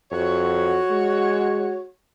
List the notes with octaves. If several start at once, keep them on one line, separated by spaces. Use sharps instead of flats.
F2 F#4 C#5
G#3